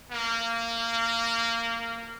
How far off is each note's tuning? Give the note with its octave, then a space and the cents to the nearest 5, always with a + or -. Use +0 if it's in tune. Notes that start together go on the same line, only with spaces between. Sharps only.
A#3 -15